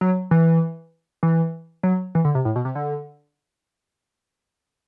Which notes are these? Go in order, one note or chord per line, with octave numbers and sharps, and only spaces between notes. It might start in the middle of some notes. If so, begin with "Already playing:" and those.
F#3
E3
E3
F#3
E3
D3
C3
A2
B2
C3
D3